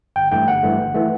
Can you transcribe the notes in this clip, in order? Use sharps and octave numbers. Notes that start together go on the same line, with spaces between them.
G1 G5
G2 E3 A3 G5
G1 F#5
G2 E3 A3
G1
E3 A3